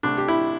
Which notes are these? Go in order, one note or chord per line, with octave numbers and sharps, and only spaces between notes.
C2 C3 A3 D4
G4
E4